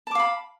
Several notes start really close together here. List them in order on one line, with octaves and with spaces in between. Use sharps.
A5 D6 F5 B5